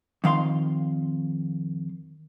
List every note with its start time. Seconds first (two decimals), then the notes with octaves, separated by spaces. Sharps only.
0.24 F2 D#3 F5 C6